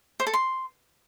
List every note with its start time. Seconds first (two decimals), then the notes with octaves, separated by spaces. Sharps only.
0.20 C5
0.27 A4
0.33 C6